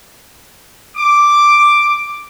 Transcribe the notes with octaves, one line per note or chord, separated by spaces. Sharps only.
D6